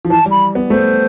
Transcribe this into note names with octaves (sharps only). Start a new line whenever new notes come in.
F3
E3 A5
G3
B5
B3
A3 C5